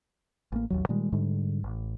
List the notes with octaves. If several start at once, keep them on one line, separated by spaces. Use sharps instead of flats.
A1 A#3
A1 D#2 F#3
A#2 D#3 G3 G#3
G#2 D3 G3
A1